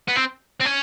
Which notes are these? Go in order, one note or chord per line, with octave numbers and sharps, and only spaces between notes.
B3
C4
C4
C#4